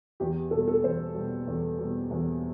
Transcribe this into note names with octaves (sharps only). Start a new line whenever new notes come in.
E2 G4
B2 G3 A4
A4
E2 C5
B2 G3
E2
B2 G3
E2